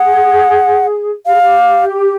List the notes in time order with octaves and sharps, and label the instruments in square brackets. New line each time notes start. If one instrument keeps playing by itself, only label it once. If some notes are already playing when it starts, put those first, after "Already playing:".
Already playing: [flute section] G#4 [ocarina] F#5
[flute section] G4 [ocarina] F5
[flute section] G#4
G4